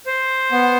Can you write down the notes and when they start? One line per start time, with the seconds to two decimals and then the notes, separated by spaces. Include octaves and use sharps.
0.06 C5
0.52 B3